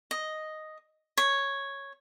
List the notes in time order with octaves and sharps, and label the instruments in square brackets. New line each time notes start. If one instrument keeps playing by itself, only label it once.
[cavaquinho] D#5
C#5